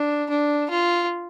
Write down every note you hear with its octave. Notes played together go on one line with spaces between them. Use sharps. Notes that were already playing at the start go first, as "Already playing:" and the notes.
Already playing: D4
D4
F4